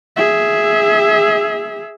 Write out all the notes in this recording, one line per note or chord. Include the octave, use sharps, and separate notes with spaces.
G#4 E5